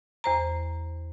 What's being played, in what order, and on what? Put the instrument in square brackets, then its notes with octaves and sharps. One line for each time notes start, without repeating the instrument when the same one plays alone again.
[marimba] E2 C5 A#5